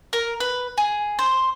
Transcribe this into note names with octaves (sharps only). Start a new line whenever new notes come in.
A#4
B4
G#4
C5